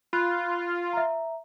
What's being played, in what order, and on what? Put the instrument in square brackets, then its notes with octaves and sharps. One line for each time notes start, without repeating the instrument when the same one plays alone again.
[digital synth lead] F4 [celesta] B5 F#6
[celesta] E5 A#5